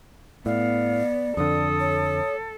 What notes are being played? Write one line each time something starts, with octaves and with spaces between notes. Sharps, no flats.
A2 B3 D5 F5
F2 D3 A4 D#6
C#5